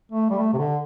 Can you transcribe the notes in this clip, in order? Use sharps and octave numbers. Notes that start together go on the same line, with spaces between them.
A3
G3
A3
C3
D3